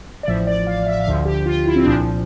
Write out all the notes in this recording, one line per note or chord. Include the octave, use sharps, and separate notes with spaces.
D5
A1 A2 F3 E5
D5
F5
E5
F5
D2 D3 F3 E5
G4
F4
E4
C4
C2 A#2 F3 D4